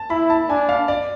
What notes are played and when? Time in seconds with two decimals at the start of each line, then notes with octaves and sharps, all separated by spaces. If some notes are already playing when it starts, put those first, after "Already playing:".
Already playing: A5
0.10 E4 B5
0.30 A5
0.49 D4 G#5
0.69 F5
0.88 D5